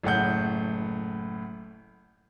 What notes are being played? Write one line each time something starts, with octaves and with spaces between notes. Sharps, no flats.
F#1 A2 F#5 G6